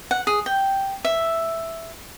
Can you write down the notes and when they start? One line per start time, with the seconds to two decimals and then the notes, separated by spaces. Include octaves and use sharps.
0.11 F#5
0.27 G#4
0.46 G5
1.05 E5